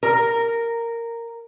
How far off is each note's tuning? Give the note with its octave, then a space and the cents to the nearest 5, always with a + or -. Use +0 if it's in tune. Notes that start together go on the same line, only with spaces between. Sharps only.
A#4 -10